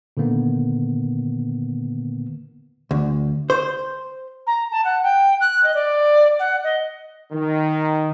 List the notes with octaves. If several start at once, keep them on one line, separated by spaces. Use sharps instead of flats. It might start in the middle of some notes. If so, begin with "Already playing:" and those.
A#2 D3 D#3 A#3 B3
D2
C5
A#5
A5
F#5
G5
F#6
D#5
D5
F#5
D#5
D#3